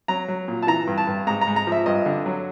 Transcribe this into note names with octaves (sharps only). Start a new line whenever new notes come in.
F#3 A#5
F#3
A#2
A5
E3 A#5
G2
A5
G2
G#2 A#5
A#5
G#2
A#5
F3 E5
G2 D#5
D3
F#3